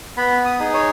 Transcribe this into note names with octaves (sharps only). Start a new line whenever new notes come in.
B3 B5
D#6
D#4 G#4
C#5